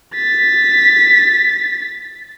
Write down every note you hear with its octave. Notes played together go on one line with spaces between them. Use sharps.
A6 B6